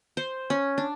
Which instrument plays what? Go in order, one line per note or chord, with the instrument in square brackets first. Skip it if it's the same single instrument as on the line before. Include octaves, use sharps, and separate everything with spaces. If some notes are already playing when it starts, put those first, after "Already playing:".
[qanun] C5
C#4
D4